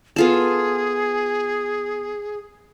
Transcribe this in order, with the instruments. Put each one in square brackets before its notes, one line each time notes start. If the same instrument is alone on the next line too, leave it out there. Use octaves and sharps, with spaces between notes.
[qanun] B3 F4 A4 [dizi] G#4